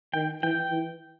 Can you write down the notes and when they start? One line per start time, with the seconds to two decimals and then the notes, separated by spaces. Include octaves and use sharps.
0.14 D#3 G5
0.42 E3 G5
0.71 E3